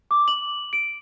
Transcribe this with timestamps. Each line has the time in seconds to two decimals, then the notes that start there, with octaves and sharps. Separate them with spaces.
0.11 D6
0.28 F#7
0.73 D7